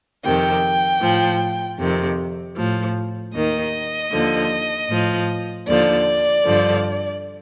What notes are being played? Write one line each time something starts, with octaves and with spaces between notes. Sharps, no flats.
F2 C3 D#3 G5
A2 F3
F2 C3 D#3
A2 F3
D#2 D#3 D#5
D#2 D3 F3
A2 F3
D#2 D3 F3 D5
G2 D3 F3